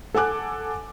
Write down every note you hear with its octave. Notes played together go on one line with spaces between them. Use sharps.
A4 F#5 G#5 D6 F#6